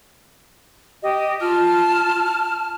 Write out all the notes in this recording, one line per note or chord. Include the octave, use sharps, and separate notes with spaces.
G4 D#5
F4 A5 F6